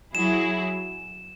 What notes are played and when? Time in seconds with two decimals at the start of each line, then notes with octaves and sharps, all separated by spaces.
0.14 F#3 E4 G#4 E7